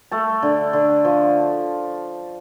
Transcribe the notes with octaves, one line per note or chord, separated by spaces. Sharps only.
A3 A5
D3
D3
F3